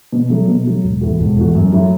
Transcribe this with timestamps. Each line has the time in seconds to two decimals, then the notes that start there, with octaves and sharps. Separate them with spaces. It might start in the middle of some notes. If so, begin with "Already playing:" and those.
0.12 B2
0.30 F#3 A3
0.48 B2
0.66 F#3 A3
0.84 E1
1.01 E2 E3 A3 F#4
1.20 E1
1.37 E2 E3 A3 F#4
1.55 F#2
1.72 F#3 A3 E4 A4